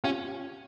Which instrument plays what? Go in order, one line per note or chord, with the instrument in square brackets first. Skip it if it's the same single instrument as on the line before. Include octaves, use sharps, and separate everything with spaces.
[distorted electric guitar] C#4 [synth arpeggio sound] F4 G4